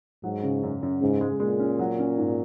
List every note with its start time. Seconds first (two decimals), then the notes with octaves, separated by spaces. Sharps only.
0.24 G#2 F#3
0.43 C#3
0.63 F#2
0.83 F#2
1.01 G#2 C#3
1.21 G#3
1.40 A#2 G#3
1.60 C#4
1.79 F#3
1.99 C#4
2.17 G#2